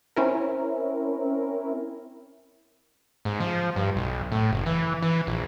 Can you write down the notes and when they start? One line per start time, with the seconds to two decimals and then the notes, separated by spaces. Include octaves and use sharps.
0.16 C4 C#4 E4 A#4
3.25 G#2
3.40 F3
3.76 G2
3.96 B1
4.32 A2
4.52 F#1
4.66 E3
5.02 E3
5.27 A#1